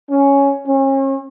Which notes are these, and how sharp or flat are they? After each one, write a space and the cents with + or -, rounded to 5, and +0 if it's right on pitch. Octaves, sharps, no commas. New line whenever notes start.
C#4 +5
C#4 -40